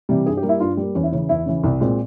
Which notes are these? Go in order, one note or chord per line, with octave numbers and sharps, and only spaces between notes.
C3 E3 G3
G2 G#4
G4
G3 A#3
E4
G2 F4
G3 A#3
E2 C#4
E4
C#3 E3 C#4
E2 E4
C#3 E3
C2
A#2 G#3 C4